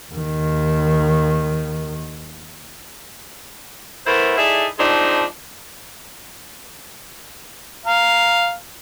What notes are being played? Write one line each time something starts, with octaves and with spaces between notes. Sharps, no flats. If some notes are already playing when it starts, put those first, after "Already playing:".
D#2 D#3
E3 A3 B3 E4 A#4 C5
D#4 E4 G#4 A4 D5 E5
F3 G#3 C4 D4 D#4
F5 A#5